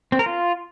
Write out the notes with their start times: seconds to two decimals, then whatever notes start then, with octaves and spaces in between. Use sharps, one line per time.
0.12 C4
0.19 A#4
0.26 F4